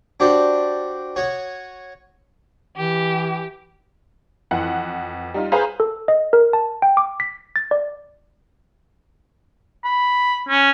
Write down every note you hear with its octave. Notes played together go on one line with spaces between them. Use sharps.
D4 F#4 G4 C5 D5
F#4 C#5 D#6
E3 G4
F2 E3 F#5
G3 D#4 F4
G#4 B4 C5 F5 A#5
A4
D#5
A#4
A5
G5
D6
B6
A6
D5
B5
C#4